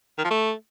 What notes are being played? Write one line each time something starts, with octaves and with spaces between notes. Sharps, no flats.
D#3
F3
A3